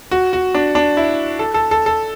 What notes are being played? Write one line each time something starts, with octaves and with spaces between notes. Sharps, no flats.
F#4
F#4
D4
D4
E4
A4
A4
A4
A4